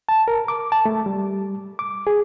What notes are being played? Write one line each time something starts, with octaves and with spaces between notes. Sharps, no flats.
A5
A#4
D6
A5
A3
G3
D6
G#4